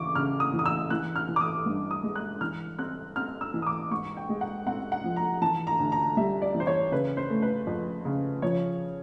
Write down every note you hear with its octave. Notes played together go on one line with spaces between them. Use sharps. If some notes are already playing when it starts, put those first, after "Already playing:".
Already playing: C#3 E3 C#6 D6
C#3 F6
D#6
E3
D#6
E6
E3 F#6
F6
E3
D6
D#6
G2
D#6
G#3
F#6
E3 F6
C4 F#6
C4 F6
E6
E3
D#6
D6
G#2 C#6
G5
G#3
F#5
C4 F#5
F#5
F3
A#5
E3 A5
A#5
D2
A#5
G3 E5
D5
E3
C5
C#5
C#3 B4
C5
A3
B4
F2
C#3
F3 C#5